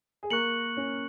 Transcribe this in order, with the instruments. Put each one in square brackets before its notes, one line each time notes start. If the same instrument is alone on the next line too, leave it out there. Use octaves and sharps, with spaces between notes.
[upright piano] G#4
[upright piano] A#3 A#4 [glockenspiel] C#6 F#6 C#7 F#7
[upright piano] C#4 C#5